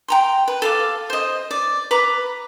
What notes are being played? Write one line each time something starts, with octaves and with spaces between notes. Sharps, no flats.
G5 A#5 C6
B4
A4 F5 D6
C5 D#5
D5
B4 A#5 D6